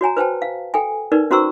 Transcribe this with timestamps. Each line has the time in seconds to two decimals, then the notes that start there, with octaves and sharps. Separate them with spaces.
0.01 F#4 C#5 G#5 A#5
0.17 B4 C5 G5 A5
0.42 F5
0.74 A4 G5 G#5
1.12 D#4 A#4 B4 D5
1.31 C#4 F#4 C5 A#5 C#6 E6